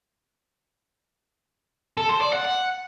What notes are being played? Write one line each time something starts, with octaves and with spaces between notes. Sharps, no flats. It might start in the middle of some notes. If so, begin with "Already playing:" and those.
A4
C5
D5
F#5
F#5